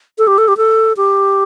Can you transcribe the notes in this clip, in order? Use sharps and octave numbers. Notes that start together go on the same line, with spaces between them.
A4
G4
A4
G4
A4
G4